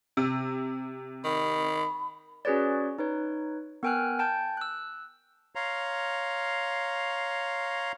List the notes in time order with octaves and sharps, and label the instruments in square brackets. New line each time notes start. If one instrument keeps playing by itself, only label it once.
[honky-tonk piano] C3
[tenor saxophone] D#3 [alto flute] B5
[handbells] C#4 F#4 G#4 B4 C#5 D5
D#4 B4 C#5
B3 A#4 G5 G#5 F6 F#6
G5 A5 G6
E6 F#6
[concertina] C#5 F5 A#5 C6